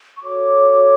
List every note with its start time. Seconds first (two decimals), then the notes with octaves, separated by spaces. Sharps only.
0.16 C#6
0.23 F#4 A4 C#5 D6